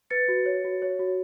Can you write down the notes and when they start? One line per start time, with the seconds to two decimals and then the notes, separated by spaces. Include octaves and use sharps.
0.10 B4 A6 C#7
0.28 F#4
0.46 C#5
0.64 F#4
0.82 C#5
0.99 F#4